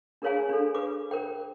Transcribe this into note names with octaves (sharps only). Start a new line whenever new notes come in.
D4 G#4 A#4 C#5 F5 G#5
D4 A4
B4 D6
A#4 C5 G5